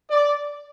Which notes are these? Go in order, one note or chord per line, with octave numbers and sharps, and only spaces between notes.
D5